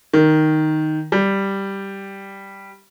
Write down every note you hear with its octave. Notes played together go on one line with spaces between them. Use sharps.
D#3
G3